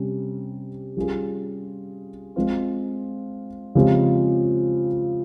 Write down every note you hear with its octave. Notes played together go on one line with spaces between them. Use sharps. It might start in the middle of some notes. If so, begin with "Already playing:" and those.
Already playing: C3 G3 C#4
G3 C#4 F4 G#4
G#3 C4 F4
C#3 F3 G#3 C4 G4